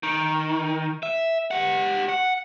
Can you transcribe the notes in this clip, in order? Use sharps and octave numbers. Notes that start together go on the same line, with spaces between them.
D#3
E5
G4 F#5
F#5